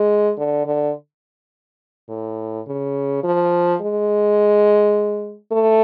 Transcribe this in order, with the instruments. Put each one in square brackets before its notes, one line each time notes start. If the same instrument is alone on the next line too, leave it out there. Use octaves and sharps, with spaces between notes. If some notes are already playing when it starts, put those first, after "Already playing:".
Already playing: [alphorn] G#3
D3
D3
A2
C#3
F3
G#3
A3